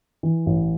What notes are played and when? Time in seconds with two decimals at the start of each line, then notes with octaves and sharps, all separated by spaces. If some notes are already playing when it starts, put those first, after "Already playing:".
0.23 E3
0.46 A1